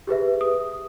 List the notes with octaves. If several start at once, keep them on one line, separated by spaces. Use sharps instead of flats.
G4 G#4 B4 E5
D#6